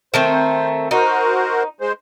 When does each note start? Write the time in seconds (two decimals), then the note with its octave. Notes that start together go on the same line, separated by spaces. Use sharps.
0.14 D#3 A3 C4 C5
0.91 D#4 F#4 A#4 C5
1.81 G#3 C5